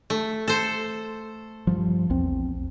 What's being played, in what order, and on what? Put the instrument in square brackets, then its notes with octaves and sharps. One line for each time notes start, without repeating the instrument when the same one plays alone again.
[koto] A3
A4 C5
[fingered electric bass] G2 F3
A#1 E2 C4